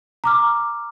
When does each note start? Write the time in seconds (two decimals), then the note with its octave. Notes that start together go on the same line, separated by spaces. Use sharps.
0.24 A#5 D6 F6